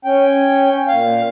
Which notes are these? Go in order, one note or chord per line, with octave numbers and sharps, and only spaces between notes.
C#4 G5
A#2 F5